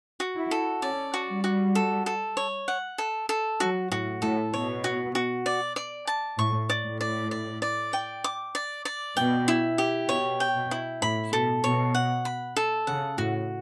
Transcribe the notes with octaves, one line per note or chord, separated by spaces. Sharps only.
F#4
E4
A4
C#4 D5
F#4
G3
F#4
A4
A4
C#5
F#5
A4
A4
F#3 F#4
A2 F#4
A2 A4
B2 C#5
F#4
F#4
D5
D5
A5
A2 C#6
D5
A2
D5
D5
D5
G5
D6
D5
D5
B2 G5
E4
G4
B2 C#5
G5
B2
E4
A2 B5
B2 A4
B2 C#5
F#5
B5
A4
C#3 F#5
A2 F#4